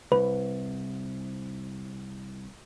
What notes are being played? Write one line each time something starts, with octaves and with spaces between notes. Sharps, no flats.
C2 B4